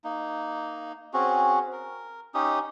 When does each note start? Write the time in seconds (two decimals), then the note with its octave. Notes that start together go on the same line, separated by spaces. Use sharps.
0.04 A#3 D#4
1.14 C4 C#4 F#4 G#4
1.72 A#4
2.34 C#4 D#4 G4 D#6